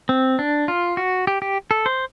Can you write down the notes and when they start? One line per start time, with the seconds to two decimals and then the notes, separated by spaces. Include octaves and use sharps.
0.09 C4
0.39 D4
0.68 F4
0.97 F#4
1.27 G4
1.42 G4
1.71 A4
1.86 C5